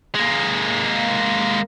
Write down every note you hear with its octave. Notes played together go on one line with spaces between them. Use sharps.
G#3 A#3